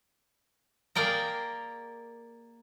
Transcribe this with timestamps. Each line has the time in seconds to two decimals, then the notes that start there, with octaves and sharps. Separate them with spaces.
0.95 A#3 G#4 A#4 D5 G5 A#5